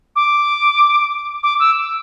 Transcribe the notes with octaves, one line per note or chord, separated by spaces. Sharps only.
D6
D6
E6